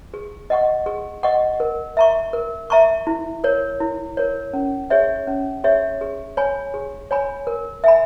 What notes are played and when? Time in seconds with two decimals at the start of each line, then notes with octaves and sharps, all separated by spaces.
0.14 G#4
0.50 D#5 F#5 C#6
0.86 G#4
1.23 D#5 F#5 C#6
1.60 A#4
1.97 E5 A#5 C#6
2.33 A#4
2.70 E5 A#5 C#6
3.07 E4
3.44 A#4 C#5
3.80 E4
4.17 A#4 C#5
4.53 C#4
4.90 G#4 C#5 E5
5.27 C#4
5.64 G#4 C#5 E5
6.01 G#4
6.37 C#5 G#5 B5
6.74 G#4
7.11 C#5 G#5 B5
7.47 A#4
7.84 E5 G#5 B5